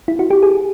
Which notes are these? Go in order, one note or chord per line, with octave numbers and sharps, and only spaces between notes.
E4
F#4
G4
G#4